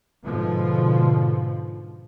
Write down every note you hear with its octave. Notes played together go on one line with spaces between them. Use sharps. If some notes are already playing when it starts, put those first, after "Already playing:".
G#2 B2 D3 F3